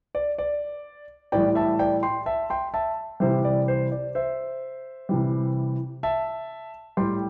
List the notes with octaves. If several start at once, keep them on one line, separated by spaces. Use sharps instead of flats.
D5
D5
A2 E3 G3 D5 G5
E5 A5
D5 G5
G5 C6
E5 A5
G5 C6
E5 A5
C3 E3 G3 C5 E5
D5
C5
D5
C5 E5
C3 E3 G3
E5 A5
A2 G3 G5 C6